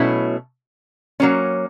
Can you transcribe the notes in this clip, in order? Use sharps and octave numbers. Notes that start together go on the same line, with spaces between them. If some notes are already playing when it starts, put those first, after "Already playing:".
Already playing: B2 F#3 A3 C#4 E4
F#3 A#3 C#4